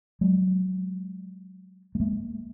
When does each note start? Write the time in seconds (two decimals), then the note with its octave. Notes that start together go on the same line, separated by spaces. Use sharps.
0.21 F#3 G#3
1.95 A3
2.00 G#3 A#3